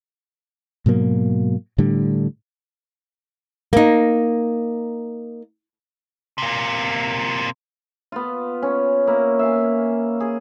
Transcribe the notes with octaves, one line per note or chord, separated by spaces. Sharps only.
G#2 B2 F#3 A#3
A2 D3 G3
A#3 D#4
C3 A#3
B3 F4
C#4
A#3 E4
E5 F5 G#5
G#4